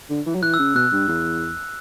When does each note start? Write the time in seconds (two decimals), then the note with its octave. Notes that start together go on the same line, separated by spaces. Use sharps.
0.10 D3
0.26 E3
0.35 F#3
0.43 E3 F#6
0.54 E6
0.59 C#3
0.75 B2 F#6
0.92 G2
1.08 E2